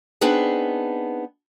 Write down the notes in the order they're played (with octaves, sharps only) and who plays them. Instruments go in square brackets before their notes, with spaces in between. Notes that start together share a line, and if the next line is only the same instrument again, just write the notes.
[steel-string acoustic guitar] B3 C4 D4 D#4 G#4 B4